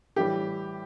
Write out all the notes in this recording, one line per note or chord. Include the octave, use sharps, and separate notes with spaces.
A2 E3 G3 G4